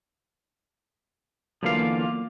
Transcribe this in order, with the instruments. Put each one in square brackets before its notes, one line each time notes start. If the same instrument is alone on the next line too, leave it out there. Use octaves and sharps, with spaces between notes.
[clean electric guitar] D3 E3 F5 [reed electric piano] F#3 A#3 B3 [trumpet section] F4 D6